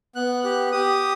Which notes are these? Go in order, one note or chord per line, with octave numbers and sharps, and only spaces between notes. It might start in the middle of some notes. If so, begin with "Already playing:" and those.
B3 F#6
G4 F#6
G4 D#6